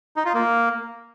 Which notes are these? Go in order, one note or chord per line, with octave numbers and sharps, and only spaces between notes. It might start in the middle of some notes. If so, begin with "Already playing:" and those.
D#4
F4
A#3